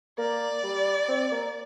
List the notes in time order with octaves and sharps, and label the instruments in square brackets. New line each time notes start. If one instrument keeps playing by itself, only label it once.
[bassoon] A#3 [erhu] D5
[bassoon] G3
C4
A#3